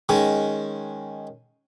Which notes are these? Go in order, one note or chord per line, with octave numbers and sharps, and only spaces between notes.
D#3 G#3 C#4